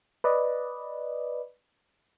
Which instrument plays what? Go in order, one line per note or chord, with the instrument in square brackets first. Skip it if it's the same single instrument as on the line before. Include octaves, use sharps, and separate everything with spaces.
[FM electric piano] B4 D5 D#5